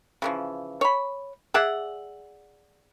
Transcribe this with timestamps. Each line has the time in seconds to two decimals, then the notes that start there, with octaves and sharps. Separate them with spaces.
0.22 C#3 E3 F3
0.81 C#5 B5
1.54 G#4 D5 E5 F#5